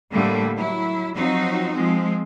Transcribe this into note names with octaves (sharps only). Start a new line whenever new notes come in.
A2 D3 G3 A3 A#3
F#3 E4
F3 F#3 C4 D#4 F#4
F3 G#3 C4